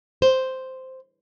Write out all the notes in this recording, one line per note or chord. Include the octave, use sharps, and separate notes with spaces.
C5